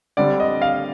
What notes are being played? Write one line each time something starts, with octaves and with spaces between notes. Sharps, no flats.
D3 G3 C4 D5
D#5
F5